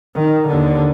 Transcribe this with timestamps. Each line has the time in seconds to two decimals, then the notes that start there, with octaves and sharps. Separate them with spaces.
0.15 D#3
0.48 D#2 D3